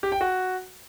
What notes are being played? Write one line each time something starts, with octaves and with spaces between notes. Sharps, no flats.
G4
G5
F#4